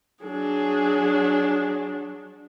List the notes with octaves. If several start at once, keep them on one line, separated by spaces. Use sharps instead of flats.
F#3 D4 G#4